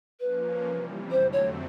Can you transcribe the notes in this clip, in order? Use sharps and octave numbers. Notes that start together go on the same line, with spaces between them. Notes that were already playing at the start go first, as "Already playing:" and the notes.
F3 A#3 C#4 B4
C3 E3 G3
F2 D3 F#3 A3 C4 C5
C#5